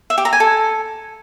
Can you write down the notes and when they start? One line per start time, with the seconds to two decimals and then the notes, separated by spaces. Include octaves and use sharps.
0.10 E5
0.18 G4
0.25 A#5
0.33 G#5
0.40 A4